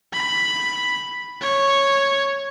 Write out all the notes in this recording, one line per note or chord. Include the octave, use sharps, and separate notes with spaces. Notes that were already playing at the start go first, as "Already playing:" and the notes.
B5
C#5